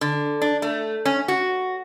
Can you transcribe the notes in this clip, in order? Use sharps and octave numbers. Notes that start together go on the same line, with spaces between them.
D3
D4
A3
C#4
F#4